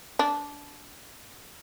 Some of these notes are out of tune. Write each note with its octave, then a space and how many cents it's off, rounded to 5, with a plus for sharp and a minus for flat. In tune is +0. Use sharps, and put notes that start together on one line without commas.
D4 -20